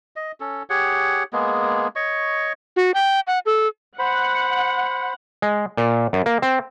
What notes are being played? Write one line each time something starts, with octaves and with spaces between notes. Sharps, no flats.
D#5
C#4 A4
G4 G#4 C#5 F#5
G#3 A#3 B3 G#4
C#5 D#5 C#6
F#4
G5
F#5
A4
C5 F#5 B5
G#3
A#2
F#2
A#3
C4